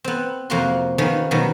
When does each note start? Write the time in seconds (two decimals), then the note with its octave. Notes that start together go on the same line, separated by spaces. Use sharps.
0.04 B3 C4
0.50 F2 C3 A#3 F#4 A#5 C6
0.98 D#3 F3 B3 C#4
1.31 B2 D#3 F#3 G3